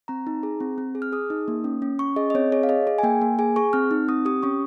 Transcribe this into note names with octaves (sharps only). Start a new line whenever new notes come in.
C4 A#5
D#4
G#4
C4
C4
G#4
F6
G#4 D#6
D#4
A#3
C#4
C#4
C#4 C#6
G#4 D#5
D#5
C4 C#5
G#4 C#5
F5
G#4 D#5
G#4
G#5
A#3 G5
A#3
G#4 G#5
G#4 C#6
C4 F6
D#4
C4 D#6
G4 D#6
C#4 C#6